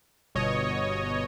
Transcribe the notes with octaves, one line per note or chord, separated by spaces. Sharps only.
G1 B2 C#5 D#5